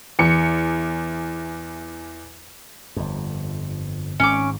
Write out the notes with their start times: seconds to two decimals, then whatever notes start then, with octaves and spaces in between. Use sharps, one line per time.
0.19 E2 C#7
2.96 G1 F2
4.20 G#1 G#2 C#4 D6